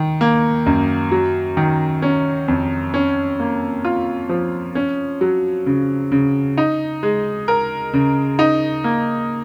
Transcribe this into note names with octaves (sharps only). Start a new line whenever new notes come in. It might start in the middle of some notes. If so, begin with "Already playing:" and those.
Already playing: D#3
A#3
F#2
F#3
D#3
C#4
F2
C#4
A#3
F4
F3
C#4
F#3
C#3
C#3
D#4
G#3
A#4
C#3
D#4
A#3